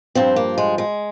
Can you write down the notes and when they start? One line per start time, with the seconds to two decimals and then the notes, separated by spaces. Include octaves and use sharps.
0.15 G2 F3 C4
0.36 A#3
0.58 G#3
0.78 G#3